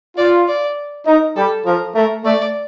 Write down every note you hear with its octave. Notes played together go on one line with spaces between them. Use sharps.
F4 D5
D5
D#4 A#4
G3 A4
F3 A#4
A3 A#4
A3 D5